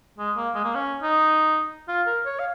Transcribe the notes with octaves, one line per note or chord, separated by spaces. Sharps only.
G#3
A#3
G#3
A#3
C#4
D#4
F4
A#4
C#5
F5